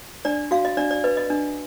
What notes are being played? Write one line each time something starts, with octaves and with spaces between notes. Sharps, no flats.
D4 D5
F#4 F5
D#5
D4 D5
D5
B4 D#5
D#5
D4